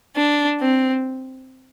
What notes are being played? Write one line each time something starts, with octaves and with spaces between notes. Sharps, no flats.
D4
C4